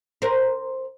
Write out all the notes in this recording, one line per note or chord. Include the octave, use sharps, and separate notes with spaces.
A#4 C5